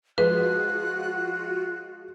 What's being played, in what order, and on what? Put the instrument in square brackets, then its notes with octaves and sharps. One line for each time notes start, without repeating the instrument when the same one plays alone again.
[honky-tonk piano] F3 G#3 [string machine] F4 F#4 [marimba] B4 [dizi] F#6